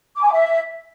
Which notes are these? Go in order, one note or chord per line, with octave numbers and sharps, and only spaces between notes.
D6
G#5
D6
E5